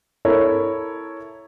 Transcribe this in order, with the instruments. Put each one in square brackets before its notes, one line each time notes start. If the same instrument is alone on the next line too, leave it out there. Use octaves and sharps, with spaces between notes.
[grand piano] E4 A4 A#4 C#5